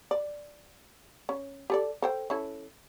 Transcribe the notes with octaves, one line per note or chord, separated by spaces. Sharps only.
D5
C#4
G4 A4 D5
A4 C5 G5
C#4 E4 A4